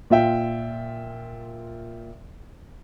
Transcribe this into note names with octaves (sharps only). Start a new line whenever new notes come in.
A#2 F4 E5 G5